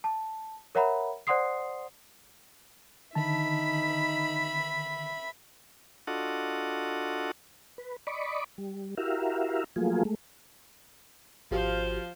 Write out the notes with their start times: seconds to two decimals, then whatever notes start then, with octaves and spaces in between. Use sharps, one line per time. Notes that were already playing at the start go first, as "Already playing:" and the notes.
0.04 A5
0.75 A#4 C#5 E5 F#5 A#5 B5
1.27 C5 D5 F#5 C6 D#6 C7
3.15 D3 D#3 D#4 E5 A5 B5
6.07 D4 F4 F#4 A4 D#5 F#5
7.78 B4
8.07 D5 D#5 B5 C#6 D6
8.58 G3
8.97 E4 F#4 G4 A#4 E5 F5
9.76 F3 F#3 A3 A#3 F4 G#4
10.05 G#3 A3
11.51 G#1 F3 F#4 G4 C5 F5